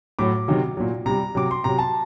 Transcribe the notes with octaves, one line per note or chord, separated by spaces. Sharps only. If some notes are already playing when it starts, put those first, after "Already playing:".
A2 F#3 D6
C3 D#3 F#3
A#2 F#3
C3 G3 A#5
C3 F#3 D6
C6
C3 F#3 A#5
A5